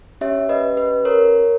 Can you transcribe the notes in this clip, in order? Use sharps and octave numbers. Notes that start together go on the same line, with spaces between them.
C#4 G4 C#5 E5
B4 D#5
B4
A#4 C#5